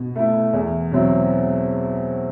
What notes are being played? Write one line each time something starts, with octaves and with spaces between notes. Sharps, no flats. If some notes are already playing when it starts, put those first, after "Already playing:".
Already playing: B2
A3 E4
E2
B2 F#3 C4 E4